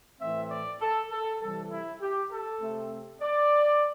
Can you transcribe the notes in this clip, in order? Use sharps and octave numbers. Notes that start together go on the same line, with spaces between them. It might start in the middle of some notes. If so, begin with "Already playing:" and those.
A2 E3 A3 C4 E5
D5
A4
A4
C3 E3 G3 A4
E4
G4
A4
C3 A3 C4
D5